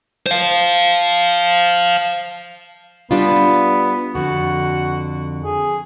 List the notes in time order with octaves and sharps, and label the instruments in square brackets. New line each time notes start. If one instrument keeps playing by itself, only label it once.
[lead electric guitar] C5 F5
[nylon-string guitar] G3 D4 F4 [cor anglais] B3
[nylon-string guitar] F2 D3 [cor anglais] F#4
[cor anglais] G#4